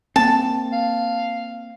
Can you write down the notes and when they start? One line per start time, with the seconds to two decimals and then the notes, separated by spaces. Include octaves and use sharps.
0.16 A#3 C4 A5
0.72 F5